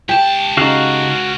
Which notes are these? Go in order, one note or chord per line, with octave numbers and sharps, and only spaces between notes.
C#2 G4 A5
C#3 D#4 F#4 F5